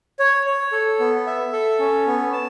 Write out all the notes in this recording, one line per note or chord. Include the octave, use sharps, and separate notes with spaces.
C#5
C#5
A4
B3
E5
A4
C#4
B3
A5